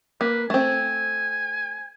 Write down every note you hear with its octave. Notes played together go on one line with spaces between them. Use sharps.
A#3 B4
A3 C4 G#5